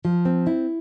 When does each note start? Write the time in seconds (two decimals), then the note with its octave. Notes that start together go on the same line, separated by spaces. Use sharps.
0.05 F3
0.25 C4
0.47 E4